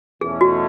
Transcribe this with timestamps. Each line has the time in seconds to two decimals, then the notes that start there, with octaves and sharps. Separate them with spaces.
0.21 E2 B2 A3 C#4 G#4
0.41 F#4